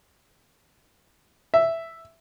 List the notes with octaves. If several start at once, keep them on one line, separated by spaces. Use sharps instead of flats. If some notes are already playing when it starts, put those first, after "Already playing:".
E5